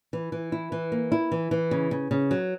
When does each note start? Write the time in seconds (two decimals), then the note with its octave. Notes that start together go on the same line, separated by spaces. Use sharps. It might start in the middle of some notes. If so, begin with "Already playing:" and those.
0.13 E3
0.32 E3
0.52 E4
0.72 E3
0.92 A#3
1.12 E4
1.32 E3
1.51 E3
1.71 C#3
1.91 C#3
2.11 C#3
2.31 F#3